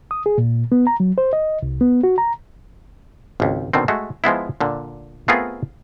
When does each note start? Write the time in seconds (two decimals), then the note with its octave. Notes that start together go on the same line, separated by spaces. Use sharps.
0.11 D#6
0.26 G#4
0.38 A#2
0.72 B3
0.87 A#5
1.00 F#3
1.18 C5
1.33 D#5
1.63 C2
1.81 B3
2.03 F#4
2.18 A#5
3.40 G#1 C#2
3.73 B2 D3 D#3 C4
3.88 G#3 A3 F#4
4.24 F3 G#3 B3 E4
4.61 A#2 D3
5.28 A3 B3 C4 F4 G#4 A#4